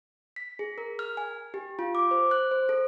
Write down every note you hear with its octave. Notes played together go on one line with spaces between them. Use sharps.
B6
G#4
A#4
F6
G#5
G4
F4
D6
C5
F#6
C5
A4